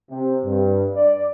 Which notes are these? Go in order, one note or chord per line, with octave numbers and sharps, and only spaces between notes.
C3
G2
D5